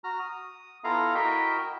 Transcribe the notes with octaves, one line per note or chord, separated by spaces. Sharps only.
F#4 A#5 F6
D#6
B3 E4 F4 A4 F5 A#5
E4 F#4 A#4 D#5 E5 G5